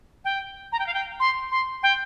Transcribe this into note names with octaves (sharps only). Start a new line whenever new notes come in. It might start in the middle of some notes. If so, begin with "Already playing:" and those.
G5
A#5
G5
F5
G5
C6
C6
G5